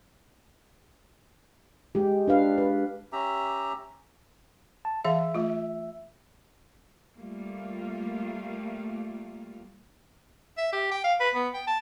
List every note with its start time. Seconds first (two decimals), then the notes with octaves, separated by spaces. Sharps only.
1.95 G#3 G4
2.28 D4 B4 F5
2.58 B4
3.12 C#4 G4 E5 A#5
4.85 A5
5.05 E3 G#4 E5 F5
5.34 A3 F4
7.16 G3 A3 A#3 F4
10.57 E5
10.72 G4
10.91 G5
11.04 F5
11.20 B4
11.35 B3
11.54 G5
11.67 A5